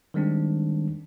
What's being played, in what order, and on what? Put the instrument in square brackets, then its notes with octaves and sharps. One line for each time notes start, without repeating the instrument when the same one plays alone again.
[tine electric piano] D#3 G3 G#3 C4 D4